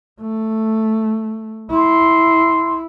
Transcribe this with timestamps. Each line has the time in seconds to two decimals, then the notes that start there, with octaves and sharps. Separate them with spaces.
0.21 A3
1.71 E4 C6